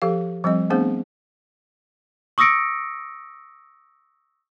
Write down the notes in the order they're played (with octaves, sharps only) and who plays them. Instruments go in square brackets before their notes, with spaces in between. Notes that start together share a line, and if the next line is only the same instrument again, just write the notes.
[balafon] F3 G4 A4 F5
F3 G3 C4 D#5
A3 B3 C4 D4 G#4 C5
[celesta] C#6 D#6 E6 A#6 C#7 D7